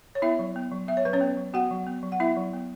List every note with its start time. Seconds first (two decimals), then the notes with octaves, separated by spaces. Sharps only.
0.15 C#5
0.22 B3 E4 E5
0.39 F#3
0.56 B3
0.71 F#3
0.88 B3 E5
0.97 C#5
1.05 F#3 B4
1.13 C#4 C#5
1.21 B3
1.37 F#3
1.54 B3 F#4 F#5
1.71 F#3
1.87 B3
2.03 F#3
2.12 F#5
2.20 B3 E4 E5
2.37 F#3
2.53 B3